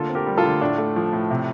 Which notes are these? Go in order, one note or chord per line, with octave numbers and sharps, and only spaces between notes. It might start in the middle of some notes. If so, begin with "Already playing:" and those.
Already playing: D3 A#3 F4 A4
C4
G4 A#4
G3
F4 A4
D3
A2 D4 F4
A3
F3
A2
C3